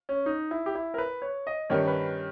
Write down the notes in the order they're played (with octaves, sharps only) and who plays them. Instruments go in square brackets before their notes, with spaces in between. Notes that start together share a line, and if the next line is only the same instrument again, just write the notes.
[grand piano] C#4
D#4
E4
G4
E4
A#4
B4
C#5
D#5
[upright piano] G2 D#3 G3 C#4 [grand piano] C#5
[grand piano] B4